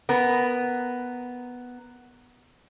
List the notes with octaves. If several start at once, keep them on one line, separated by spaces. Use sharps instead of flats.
B3 A#4